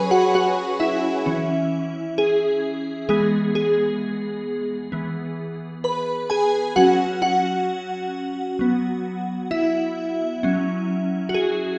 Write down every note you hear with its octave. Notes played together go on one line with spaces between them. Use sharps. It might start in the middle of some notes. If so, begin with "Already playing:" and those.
Already playing: F#3 C#4 G#4 B4 C#5 G#5 B5 C#6
F#4 F#5
F#4 F#5
E4 E5
E3 C#4
G#4
E3 G#3 B3 G#4
G#4
E3 B3
B4 B5
G#4 G#5
F#3 C#4 F#4 F#5
F#4 F#5
F#3 B3
E4 E5
F#3 C#4
F#4
G#4